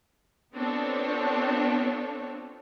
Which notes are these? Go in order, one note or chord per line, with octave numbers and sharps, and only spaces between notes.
B3 C4 D4 F4 A4 C#5